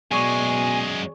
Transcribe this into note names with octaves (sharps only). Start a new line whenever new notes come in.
F#2 B2 G#3 G#4 D5 G#5 C#6